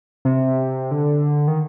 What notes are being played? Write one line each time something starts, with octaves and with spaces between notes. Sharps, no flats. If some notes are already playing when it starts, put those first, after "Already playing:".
C3
D3
D#3